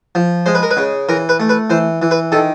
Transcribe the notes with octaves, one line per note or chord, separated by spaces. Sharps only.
F3
G#3 C5
B4
A#4
B4
C#3
E3 A#4
B4
A3
B4
E3 C5
E3
B4
D#3 A4